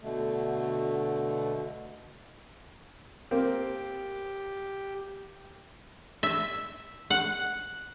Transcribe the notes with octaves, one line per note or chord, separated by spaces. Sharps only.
B2 D3 A3
A#3 C4 G4
E5
F#5